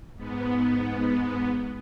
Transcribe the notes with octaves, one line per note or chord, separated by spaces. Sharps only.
G#2 B3